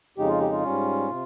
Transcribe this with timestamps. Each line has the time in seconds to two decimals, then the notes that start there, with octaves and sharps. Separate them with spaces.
0.17 F2 C#3 G#3 D#4 G4
0.29 F4
0.40 G4
0.52 F4
0.63 G#2 G3 C#4
1.10 C3